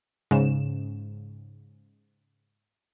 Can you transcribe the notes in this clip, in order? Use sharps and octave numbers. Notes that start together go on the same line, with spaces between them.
G#2 C#3 E7